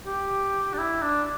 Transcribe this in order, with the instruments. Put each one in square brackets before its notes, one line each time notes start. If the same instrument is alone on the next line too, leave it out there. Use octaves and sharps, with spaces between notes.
[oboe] G4
D4
E4
D4